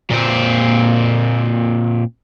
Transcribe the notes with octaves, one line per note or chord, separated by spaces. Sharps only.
A#2 C4